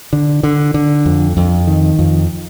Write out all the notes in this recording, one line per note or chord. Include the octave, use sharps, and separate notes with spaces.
D3
D3
D3
F2
F2
D#3
F2